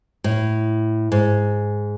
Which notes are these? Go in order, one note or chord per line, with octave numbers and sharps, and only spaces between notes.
A2
G#2